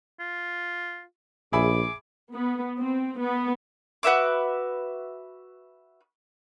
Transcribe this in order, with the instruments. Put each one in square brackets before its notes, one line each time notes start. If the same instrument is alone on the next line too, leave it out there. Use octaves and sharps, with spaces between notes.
[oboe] F4
[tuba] A#1 [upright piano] G#4 E5 B5 [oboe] D6
[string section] B3
C4
B3
[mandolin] F#4 B4 E5 D6